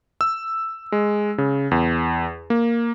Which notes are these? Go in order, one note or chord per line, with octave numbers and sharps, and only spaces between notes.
E6
G#3
C#3
E2
A#3